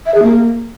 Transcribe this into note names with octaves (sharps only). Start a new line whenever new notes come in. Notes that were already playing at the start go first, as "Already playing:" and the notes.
E5
G#4
A#3